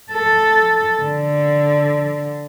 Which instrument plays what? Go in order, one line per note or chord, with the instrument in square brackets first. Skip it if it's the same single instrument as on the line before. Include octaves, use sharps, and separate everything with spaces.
[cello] A4
D3